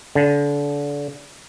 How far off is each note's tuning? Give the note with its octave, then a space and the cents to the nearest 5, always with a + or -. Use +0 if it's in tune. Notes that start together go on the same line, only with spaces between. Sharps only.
D3 -30